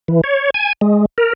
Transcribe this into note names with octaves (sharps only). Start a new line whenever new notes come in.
E3
C#5
G#5
G#3
A#4